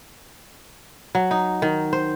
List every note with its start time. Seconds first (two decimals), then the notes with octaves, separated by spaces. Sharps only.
1.15 F#3
1.31 D#4
1.62 D#3
1.93 C5